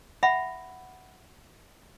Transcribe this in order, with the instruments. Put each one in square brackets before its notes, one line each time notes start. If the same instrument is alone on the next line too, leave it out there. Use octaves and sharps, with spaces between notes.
[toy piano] E5 F#5 B5